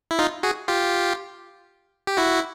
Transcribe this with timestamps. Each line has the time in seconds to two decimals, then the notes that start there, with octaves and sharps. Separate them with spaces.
0.11 E4
0.19 D#4 F4
0.43 F#4 G#4
0.68 F4 G4
2.07 G4
2.17 E4 F#4